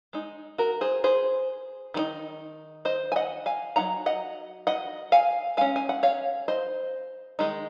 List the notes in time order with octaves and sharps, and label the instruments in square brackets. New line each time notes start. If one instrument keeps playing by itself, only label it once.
[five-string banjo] G#3 D#4
F#4 A#4
G#4 C5
G#4 C5
D#3 G#3 D#4
C5 D#5
G#5
D#5 F#5
F5 G#5
F#3 A#3 D#4 F#5 A#5
D#5 F#5
D#5 F#5
F5 G#5
G#3 C#4 F5 G#5
G#5
F#5
C#5 F5
C5 D#5
D#3 G#3 D#4